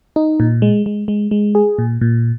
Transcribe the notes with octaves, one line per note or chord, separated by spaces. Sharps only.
D#4
A#2
G#3
G#3
G#3
G#3
G#4
A#2
A#2